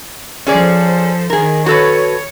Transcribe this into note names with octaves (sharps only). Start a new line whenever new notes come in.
F3 C#4 G#4 A4 C5 D5
D#3 G#4 A#4
F#4 A4 B4 C#5